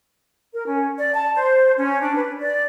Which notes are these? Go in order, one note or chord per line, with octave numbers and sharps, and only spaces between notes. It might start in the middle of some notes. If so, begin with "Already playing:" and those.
A#4
C#4
D5
A5
C5
C#4
D4
B4
D5